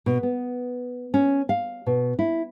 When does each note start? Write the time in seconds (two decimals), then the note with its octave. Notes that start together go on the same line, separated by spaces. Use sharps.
0.06 B2
0.23 B3
1.14 C#4
1.49 F5
1.86 B2
2.19 E4